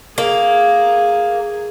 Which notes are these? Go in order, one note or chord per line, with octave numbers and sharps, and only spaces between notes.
A#3 G#4